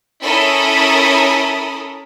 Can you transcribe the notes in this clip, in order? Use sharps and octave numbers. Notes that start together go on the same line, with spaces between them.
C#4 E4 A4 A#4 B5 D#6